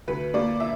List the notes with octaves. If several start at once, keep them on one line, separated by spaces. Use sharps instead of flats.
D2 B4
A#3 D5
E5